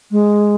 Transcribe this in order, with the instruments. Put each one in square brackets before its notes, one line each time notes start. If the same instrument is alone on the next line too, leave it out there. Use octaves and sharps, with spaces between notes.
[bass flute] G#3